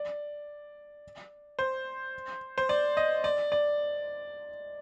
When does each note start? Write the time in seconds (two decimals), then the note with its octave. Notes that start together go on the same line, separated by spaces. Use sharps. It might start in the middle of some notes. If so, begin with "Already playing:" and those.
Already playing: D5
1.59 C5
2.58 C5
2.69 D5
2.97 D#5
3.24 D5
3.52 D5